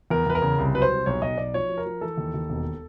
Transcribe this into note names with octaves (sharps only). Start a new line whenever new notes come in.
E2 A#4
E2 B4
A#4
C#3
C2
F#3 B4
C5
C2
B1 C#5
B1 D#5
B1 D5
F3 C#5
F3
A#4
F3
E3 A4
D#2
D#2
E1